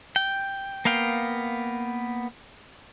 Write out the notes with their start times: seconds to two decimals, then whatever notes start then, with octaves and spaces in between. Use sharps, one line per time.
0.16 G5
0.85 A#3 B3 F5 G5